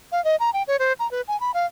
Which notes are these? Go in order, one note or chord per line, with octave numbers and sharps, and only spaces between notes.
F5
D#5
A#5
G5
C#5
C5
A#5
B4
G#5
B5
F5